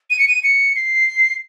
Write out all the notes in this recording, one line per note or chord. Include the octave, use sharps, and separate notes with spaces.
D#7
C#7
D#7
C#7
C7